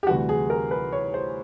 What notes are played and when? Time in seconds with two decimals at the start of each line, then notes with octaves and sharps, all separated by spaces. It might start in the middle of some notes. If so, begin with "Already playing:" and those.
0.03 G4
0.07 D2 C3 E3 G3 F#4
0.29 G#4
0.50 A#4
0.71 B4
0.92 C#5
1.14 C5